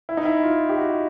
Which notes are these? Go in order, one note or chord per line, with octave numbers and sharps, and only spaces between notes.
E4
D#4
E4
F4
G4
F#4